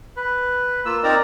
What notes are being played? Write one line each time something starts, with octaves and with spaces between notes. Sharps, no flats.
B4
A#3 F4 E6
C4 D#4 A#4 D5 A#5